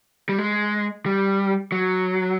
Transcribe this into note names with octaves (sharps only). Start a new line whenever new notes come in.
G3
G#3
G3
F#3